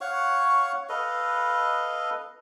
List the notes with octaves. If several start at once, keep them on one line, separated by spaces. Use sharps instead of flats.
C#5 F5 F#5 C#6
A4 B4 D#5 F5